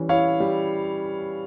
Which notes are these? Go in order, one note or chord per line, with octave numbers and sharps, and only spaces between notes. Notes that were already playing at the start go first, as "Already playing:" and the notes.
Already playing: E3 G3 C#4
E4 C#5 F5
G3